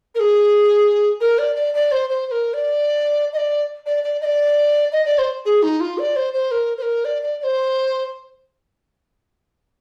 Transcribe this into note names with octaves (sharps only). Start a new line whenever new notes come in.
A#4
G#4
A#4
D5
D5
D5
C5
C5
C5
A#4
D5
D#5
D5
D5
D5
D#5
D5
D#5
D5
C5
G#4
D#4
F4
D5
C5
C5
A#4
C5
A#4
D5
D5
D5
C5